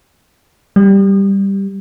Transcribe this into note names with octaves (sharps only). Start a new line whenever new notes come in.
G3